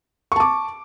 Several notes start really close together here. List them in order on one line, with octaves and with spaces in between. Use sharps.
C#6 A5 D6